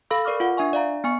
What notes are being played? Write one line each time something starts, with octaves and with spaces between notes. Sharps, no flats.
A4 F5 B5 E6
A#4 D5 C#6 D6 F6
F4 F#5
D4 E5 G#5 C#6
D5 F5 A#5
B3 G#5 C#6 C#7